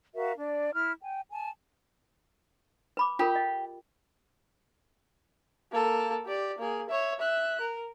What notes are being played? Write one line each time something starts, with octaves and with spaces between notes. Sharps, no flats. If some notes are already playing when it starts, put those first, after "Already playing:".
F#4 A#4 E5 F5
D4 D5
E4 F6
G5 G#5
G#5 A5
B4 B5 D6
F4 G4 A4 A#4
D#5
A#3 A4
G4 D5
A#3 G#4
C#5 E5
E5 F#6
A#4